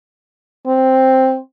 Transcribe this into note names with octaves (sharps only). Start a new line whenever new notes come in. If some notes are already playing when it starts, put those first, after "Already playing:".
C4